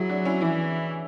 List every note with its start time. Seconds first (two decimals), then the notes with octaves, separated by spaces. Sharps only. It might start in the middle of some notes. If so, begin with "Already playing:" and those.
Already playing: F#3 E4 G#4
0.09 D4 F#4
0.25 C#4 E4
0.41 E3 C#4 E4